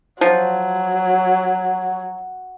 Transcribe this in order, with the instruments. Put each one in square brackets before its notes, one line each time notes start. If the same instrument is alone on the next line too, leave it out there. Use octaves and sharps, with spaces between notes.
[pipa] F3 [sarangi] F#3